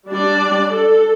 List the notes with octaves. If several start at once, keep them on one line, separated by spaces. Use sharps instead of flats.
G3 D4 D5
A4